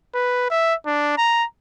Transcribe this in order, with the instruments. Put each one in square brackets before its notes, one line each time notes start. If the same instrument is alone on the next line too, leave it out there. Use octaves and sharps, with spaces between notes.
[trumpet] B4
E5
D4
A#5